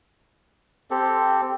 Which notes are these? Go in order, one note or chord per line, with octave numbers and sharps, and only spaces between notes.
C4 G4 A4